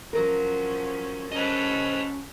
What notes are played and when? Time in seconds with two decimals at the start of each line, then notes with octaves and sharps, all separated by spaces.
0.13 F3 F#3 C#4 A#4
1.32 C#4 A4 B4 C5 D#5